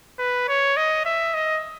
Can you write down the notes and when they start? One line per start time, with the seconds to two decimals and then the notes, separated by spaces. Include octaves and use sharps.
0.19 B4
0.48 C#5
0.76 D#5
1.05 E5
1.34 D#5